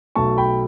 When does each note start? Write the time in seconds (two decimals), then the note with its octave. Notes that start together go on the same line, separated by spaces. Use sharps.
0.16 B1 B2 F#3 A3 A5 C#6
0.38 G5 B5